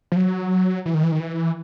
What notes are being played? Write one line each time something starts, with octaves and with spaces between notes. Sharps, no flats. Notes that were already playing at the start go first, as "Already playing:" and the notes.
F3
F#3
E3
D#3
E3
D#3
E3